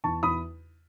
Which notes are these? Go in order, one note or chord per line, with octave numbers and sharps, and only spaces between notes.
E2 A5 C#6
E2 B5 D#6